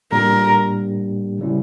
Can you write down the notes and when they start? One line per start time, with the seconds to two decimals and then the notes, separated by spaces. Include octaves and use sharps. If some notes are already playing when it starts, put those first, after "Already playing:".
0.12 A2 G3 A#3 D4 G4 A#4
1.39 C#3 G3 C#4 E4